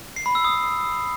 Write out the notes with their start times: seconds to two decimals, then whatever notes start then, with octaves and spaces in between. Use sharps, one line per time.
0.16 C7
0.26 B5
0.35 E6
0.45 D#6